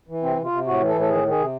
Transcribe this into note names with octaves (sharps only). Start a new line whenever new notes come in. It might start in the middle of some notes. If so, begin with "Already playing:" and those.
E3
C3 C4
C3
F4
C3
A2 F#4
E3
A4
A2
A4
D#3 G#4
D#3
G#4
C3